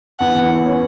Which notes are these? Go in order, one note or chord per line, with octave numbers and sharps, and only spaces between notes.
E2 F#5
E3
B3
C#4